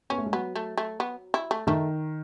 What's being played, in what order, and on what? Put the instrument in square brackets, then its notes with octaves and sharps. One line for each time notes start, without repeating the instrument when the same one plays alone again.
[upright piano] B3 [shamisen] C#4
[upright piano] A3
G#3
[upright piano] F#3 [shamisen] B3
[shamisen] A3
A3
B3
E4
A3
[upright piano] D#3 [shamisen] A3